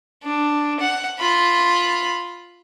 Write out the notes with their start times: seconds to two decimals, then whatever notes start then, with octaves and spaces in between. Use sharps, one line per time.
0.24 D4
0.80 F#5
1.19 F4 B5